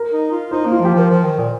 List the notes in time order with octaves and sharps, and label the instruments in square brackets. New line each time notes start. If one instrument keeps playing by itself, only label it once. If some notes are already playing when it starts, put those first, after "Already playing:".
Already playing: [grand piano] A#4
[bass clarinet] D#4
F4
[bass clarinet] D#4 [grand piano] C5
[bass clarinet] A#3
[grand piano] F4
[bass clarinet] F3 [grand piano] G4
[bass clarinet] F3 [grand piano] A#4
[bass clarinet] F3 [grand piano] C5
[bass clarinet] D#3
A#2